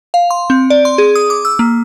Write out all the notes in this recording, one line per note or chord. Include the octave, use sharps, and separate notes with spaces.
F5
C6
C4
D5
C6
G#4
D#6
D6
E6
A#3